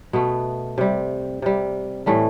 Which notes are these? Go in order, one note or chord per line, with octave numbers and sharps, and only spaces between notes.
B2 A3 B3
C3 G3
C3 G3
A2 E3 G3 A3